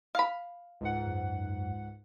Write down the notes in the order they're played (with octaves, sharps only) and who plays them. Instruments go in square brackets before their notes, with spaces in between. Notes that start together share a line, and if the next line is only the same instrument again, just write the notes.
[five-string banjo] F5 B5
[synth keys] C#2 G#2 F#5
[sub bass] F#2